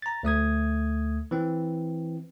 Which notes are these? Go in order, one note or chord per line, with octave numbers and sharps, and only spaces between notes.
A#5 A6
D2 A3 D#6 G#6
E3 C4